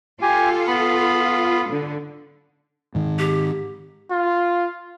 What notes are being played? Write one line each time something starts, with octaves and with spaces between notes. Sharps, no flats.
F4 G4 A4 G#5
B3 B5
D3
G#2 D#3
G4
F4